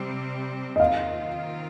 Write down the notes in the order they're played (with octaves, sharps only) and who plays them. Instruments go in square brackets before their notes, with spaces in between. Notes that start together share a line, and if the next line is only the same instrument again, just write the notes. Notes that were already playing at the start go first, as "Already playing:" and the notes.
Already playing: [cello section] C3 G3 C4
[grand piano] D#5
[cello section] D#3 C4 F4 [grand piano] F5